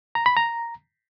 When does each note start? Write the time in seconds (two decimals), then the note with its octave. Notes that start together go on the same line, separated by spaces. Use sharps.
0.15 A#5
0.26 B5
0.37 A#5